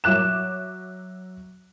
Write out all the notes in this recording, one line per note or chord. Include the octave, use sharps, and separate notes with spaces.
F#3 E5 D6 F#6 E7